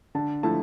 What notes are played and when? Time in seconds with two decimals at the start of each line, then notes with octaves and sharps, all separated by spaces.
0.15 D3 A5
0.43 F3 A3 E4 A5